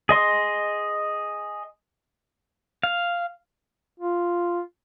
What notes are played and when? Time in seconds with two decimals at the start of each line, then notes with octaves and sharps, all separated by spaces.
0.09 G#4 D#5 C6
2.83 F5
3.99 F4